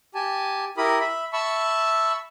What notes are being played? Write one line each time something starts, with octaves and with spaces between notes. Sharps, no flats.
G4 G#5 A5
E4 G4 A#4 B5 D#6
E5 B5
E5 A5 B5 C#6 E6